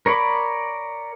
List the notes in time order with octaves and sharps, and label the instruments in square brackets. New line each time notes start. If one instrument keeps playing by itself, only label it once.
[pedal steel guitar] A#4 C#5 D5 B5 D6